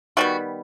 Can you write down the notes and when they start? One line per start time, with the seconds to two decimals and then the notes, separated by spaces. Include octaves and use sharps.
0.17 D#3 G3 B3 F#4